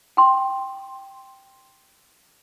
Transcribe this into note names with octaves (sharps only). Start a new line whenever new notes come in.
G5 C6